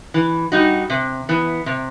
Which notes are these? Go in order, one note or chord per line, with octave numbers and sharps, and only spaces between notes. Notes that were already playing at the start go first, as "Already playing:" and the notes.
E3
G3 D#4 F#4
C3
E3 B3
C3